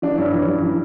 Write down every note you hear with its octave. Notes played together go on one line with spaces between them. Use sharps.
E3 D4
G2 C#4 E4
E3 D4
G2
E3